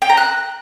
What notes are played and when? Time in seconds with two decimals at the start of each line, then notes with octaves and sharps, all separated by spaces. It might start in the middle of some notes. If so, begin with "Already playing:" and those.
0.02 G5
0.10 A#5
0.17 F#6